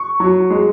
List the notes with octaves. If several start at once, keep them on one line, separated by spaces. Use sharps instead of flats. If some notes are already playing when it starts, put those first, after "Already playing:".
Already playing: C#6
F#3
G#3